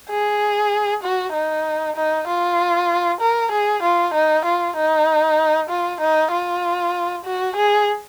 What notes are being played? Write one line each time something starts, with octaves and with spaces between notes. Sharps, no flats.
G#4
F#4
D#4
D#4
F4
A#4
G#4
F4
D#4
F4
D#4
F4
D#4
F4
F#4
G#4